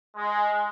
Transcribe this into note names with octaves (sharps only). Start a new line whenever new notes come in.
G#3